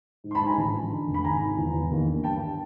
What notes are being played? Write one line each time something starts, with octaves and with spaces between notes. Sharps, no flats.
G#2
C6
A5 B5
G#2
G#5 A#5
A1
F3
D3
F1
B5
G#1 G#5 A#5
G#2
E2
E2
D#2
D3
G2 G5 A5